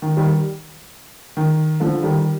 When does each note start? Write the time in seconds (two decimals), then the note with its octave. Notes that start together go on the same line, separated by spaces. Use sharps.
0.02 D#3
0.17 D#3 G3
1.37 D#3
1.80 D3 F3
2.03 D#3 G3